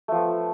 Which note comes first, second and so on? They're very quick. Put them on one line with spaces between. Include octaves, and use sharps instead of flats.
A3 F3 B3